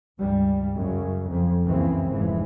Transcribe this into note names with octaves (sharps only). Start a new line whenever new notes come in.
C#2 G2 G3
F#2 C#3 F#3
F2
C#2 F#2 C#3 E3 A#3 C4
F1 G#2 E3